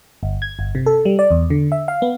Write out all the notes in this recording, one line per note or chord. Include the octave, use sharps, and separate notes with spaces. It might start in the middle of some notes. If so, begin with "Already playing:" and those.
G1
G#6
G1
C3
A4
G3
D5
E2
D3
E5
F5
B3